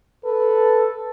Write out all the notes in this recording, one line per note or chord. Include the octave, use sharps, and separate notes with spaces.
A4 B4